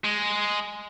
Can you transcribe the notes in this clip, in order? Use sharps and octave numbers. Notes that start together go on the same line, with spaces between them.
G#3